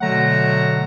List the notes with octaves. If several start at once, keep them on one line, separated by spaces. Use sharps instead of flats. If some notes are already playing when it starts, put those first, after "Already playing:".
B2 D3 F#3 A3 F#5 A#5